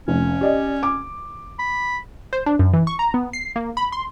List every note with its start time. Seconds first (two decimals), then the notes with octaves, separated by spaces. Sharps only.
0.08 F1 C#4
0.41 G4 D5 D#5
0.83 D6
1.59 B5
2.33 C5
2.46 D4
2.59 F#2
2.73 E3
2.87 C#6
2.99 A#5
3.14 B3
3.33 C7
3.56 A#3
3.77 B5
3.92 C6